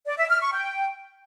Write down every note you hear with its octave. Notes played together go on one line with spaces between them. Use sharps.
D5
E5
F6
C#6
G5